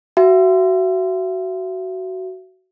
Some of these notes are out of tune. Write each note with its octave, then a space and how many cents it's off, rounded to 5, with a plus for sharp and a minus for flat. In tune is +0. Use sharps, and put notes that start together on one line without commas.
F#4 +15 E5 +35